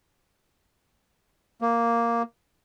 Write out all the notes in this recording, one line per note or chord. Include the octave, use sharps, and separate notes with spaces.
A#3